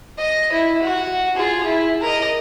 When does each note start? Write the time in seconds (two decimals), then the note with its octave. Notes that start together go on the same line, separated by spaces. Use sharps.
0.18 D#5
0.52 E4
0.83 F#4
1.36 F4 G#4
1.65 E4
2.01 A#4 D#5